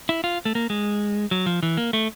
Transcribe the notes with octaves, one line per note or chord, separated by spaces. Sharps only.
E4
F4
A3
A#3
G#3
F#3
F3
E3
A#3
A3